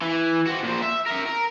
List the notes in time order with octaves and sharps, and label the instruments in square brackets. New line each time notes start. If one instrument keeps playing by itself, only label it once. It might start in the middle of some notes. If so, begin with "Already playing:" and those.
[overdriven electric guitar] E3
C4 F#4
A#2 C5
E5
A#4 E5
A#4